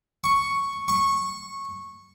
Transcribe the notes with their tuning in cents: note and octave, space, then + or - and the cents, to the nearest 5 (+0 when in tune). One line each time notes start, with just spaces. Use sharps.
C#6 +0
C#6 -15